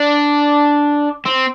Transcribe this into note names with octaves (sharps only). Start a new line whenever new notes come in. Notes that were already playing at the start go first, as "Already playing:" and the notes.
Already playing: D4
C4